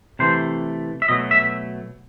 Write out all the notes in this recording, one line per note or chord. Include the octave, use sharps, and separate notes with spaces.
C3 E3 A3 C5
E5
B2 F#3 A3 D#5
E5